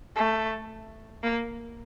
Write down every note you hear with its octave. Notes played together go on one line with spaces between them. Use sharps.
A3
A#3